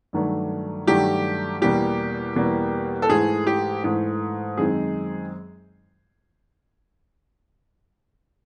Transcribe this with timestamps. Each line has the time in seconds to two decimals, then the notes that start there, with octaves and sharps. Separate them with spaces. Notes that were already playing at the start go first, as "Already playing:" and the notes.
0.13 G2 D#3 F#3 A3 D4
0.87 G2 D#3 F#3 A3 D4 G4
1.62 E2 B2 G3 A#3 G4
2.36 E2 B2 G3 A#3
3.02 A4
3.10 G#2 E3 A3 G#4
3.47 G4
3.84 G#2 E3 A3
4.57 F#2 D#3 G#3 C4 D#4 G#4